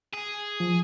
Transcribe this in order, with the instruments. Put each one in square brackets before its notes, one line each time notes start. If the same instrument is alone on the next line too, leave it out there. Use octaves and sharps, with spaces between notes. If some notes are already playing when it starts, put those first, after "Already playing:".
[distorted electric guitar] G#4
[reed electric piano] F3